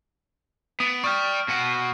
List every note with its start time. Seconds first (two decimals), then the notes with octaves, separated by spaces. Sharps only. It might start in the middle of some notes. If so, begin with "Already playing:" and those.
0.80 B3 D#6 D7
1.04 D5 G5 C#6 D#6 F6
1.48 B2 F#5